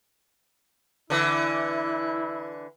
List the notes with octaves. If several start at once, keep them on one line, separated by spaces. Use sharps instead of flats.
D3 E3 E4